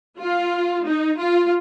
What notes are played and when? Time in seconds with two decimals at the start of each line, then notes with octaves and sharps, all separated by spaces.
0.18 F4
0.85 D#4
1.18 F4